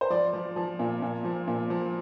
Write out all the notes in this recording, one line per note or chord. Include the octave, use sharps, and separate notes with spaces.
C5
F3 D5
F3
F3
A#2
A#2
F3
A#2
F3